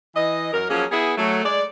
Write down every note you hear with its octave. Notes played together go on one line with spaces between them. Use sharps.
E3 D#5
F#2 A#4
F3 F#3 A#3 C#4 G#4
B3 E4 G#4
F#3 A3
G#3 D5